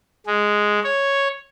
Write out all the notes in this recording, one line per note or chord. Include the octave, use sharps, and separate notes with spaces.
G#3
C#5